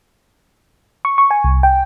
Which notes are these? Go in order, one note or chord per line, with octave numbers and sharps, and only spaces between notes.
C#6
C#6
G#5
C2
G5